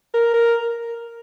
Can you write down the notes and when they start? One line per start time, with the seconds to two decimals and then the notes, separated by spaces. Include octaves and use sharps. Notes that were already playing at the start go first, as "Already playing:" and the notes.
0.14 A#4
0.34 A#4